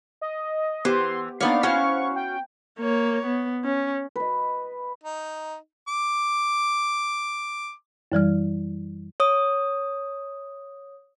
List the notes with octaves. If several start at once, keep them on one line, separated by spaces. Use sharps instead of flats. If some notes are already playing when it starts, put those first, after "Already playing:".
D#5
E3 B3 G4 C5 C6
A#3 B3 D4 D#4 C#5 D5 F5
C#4 E4 F#4 C5 F5 F#5 C#6
G5
A#3 C#5
B3
C#4
B4 D#5
D#4
D6
F#2 E3 G3 F6
C#5 D#6